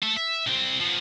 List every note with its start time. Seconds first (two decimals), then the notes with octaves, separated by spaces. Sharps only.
0.03 A4 E5
0.17 E5
0.47 C2 C4
0.80 F3 B3